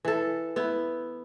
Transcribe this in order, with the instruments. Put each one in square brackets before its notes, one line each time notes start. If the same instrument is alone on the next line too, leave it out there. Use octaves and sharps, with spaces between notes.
[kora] E3 A4
B3 E4